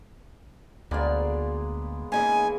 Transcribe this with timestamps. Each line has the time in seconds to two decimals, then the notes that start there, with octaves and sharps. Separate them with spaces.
0.91 D2 G#3 A#3 B3 D5 F5
2.12 C#3 E3 A#3 D#4 D#5 G#5